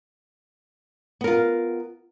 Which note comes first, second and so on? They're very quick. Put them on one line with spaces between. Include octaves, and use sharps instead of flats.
B3 A#4 F4